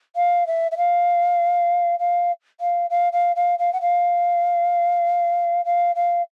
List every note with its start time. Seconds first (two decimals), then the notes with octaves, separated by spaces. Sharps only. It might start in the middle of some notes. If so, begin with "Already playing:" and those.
0.16 F5
0.47 E5
0.71 E5
0.77 F5
1.99 F5
2.60 F5
2.90 F5
3.12 F5
3.36 F5
3.59 F5
3.73 F#5
3.81 F5
5.65 F5
5.95 F5